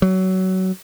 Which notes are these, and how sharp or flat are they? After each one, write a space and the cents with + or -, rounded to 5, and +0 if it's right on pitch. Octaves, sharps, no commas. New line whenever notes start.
F#3 +20